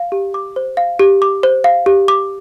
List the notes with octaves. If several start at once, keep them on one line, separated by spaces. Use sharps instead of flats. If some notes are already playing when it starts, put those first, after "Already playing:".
Already playing: F5
G4
D6
C5
F5
G4
D6
C5
F5
G4
D6